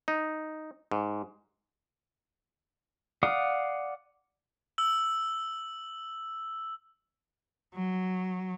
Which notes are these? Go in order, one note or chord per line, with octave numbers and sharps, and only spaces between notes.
D#4
G#2
D5 F5 F#5 D#6
E6 F#7
F#3